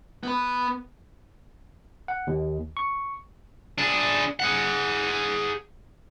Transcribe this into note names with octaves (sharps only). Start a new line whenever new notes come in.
B3 B4
F#5
D#2
C#6
D4 G#4
G#4 F#5